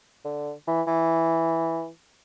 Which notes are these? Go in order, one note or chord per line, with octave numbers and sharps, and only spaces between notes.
D3
E3
E3